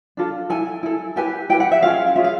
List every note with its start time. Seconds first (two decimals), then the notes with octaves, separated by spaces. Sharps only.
0.17 D4 F4 A4
0.50 E4 A4 G#5
0.83 E4 A4
1.16 E4 G4 B4 G#5
1.49 E4 G4 B4 G5
1.60 F#5
1.72 E5
1.82 C#4 F4 G#4 F5
2.16 C#4 F4 G#4 E5
2.24 F5